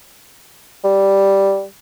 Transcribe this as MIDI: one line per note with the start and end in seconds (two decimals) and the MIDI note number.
0.84 1.64 55